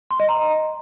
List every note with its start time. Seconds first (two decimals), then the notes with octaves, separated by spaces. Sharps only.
0.11 C6
0.20 D#5
0.29 A#5